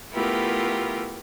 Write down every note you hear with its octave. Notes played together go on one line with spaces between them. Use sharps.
A3 B3 E4 F4 G4 A#4